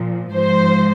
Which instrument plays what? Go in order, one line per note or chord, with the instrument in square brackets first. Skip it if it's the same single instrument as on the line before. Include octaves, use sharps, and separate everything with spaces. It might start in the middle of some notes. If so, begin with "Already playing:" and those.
Already playing: [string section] A#2 F3
G#2 F3 C5